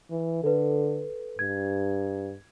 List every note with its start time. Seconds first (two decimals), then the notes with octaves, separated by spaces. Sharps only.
0.11 E3
0.44 D3 A4 B4
1.39 G2 G#6